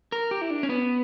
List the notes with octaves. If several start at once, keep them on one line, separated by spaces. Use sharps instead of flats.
A#4
G4
E4
D4
C#4
B3